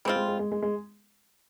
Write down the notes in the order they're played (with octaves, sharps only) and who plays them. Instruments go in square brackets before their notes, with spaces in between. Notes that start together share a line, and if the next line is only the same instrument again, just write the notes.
[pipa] G3 C4 F4 [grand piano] G#3
[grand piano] G#3
G#3
G#3
G#3
G#3